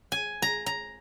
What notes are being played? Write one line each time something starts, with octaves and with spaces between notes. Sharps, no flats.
G#5
A#5
A#5